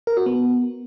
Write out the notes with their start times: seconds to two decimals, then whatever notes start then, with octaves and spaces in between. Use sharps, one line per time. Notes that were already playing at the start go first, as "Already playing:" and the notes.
0.07 A#4
0.17 F#4
0.26 B3